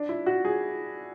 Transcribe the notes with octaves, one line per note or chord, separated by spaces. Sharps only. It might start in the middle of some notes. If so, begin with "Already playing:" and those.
Already playing: D4
E4
F#4
G#4